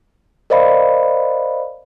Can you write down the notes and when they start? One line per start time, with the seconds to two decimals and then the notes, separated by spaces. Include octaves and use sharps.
0.50 A#4 C5 D5 D#5 F5 B5